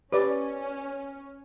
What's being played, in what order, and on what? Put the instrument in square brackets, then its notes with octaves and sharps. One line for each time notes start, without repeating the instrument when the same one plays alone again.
[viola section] C#4 [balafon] G4 [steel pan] B4 D5